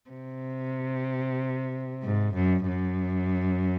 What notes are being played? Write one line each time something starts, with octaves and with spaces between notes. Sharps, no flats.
C3
G#2
F#2
F#2